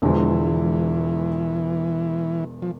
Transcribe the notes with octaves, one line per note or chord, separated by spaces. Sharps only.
E1 E2 D3 E3 F3 G#3
F3